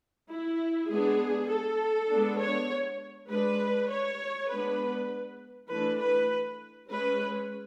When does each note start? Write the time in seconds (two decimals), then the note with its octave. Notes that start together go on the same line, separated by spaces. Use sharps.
0.29 E4
0.88 G#3 B3 D4 G#4
1.49 A4
2.09 G#3 B3 D4
2.40 C#5
3.29 G#3 D4 B4
3.90 C#5
4.50 G#3 B3 D4 B4
5.69 E3 A3 D4 B4
6.01 B4
6.90 G#3 C#4 B4